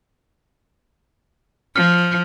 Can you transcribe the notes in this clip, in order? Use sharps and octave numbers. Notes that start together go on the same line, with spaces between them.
F3 F6